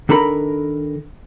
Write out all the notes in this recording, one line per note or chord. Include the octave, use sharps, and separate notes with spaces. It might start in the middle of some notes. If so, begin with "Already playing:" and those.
D#3 D4 A4 A#4 A#5 B5